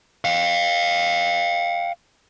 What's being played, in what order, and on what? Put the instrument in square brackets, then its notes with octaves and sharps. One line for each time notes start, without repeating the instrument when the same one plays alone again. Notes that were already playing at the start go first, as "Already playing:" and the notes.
[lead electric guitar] F5 G5